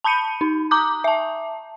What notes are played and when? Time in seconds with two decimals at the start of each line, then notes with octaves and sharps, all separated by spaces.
0.04 A5 B5 G6 C#7 D#7
0.41 D#4
0.71 A#5 D6 D#6 G6
1.04 E5 A5